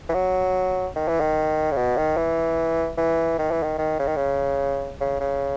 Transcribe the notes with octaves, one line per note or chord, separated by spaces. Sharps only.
E3
F#3
D#3
E3
D#3
C#3
B2
D#3
E3
E3
D#3
E3
D#3
D#3
C#3
D#3
C#3
C#3
C#3